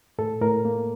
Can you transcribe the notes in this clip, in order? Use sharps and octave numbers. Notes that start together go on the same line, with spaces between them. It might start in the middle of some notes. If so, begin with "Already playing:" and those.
A2 A4
A2 A#4
A#3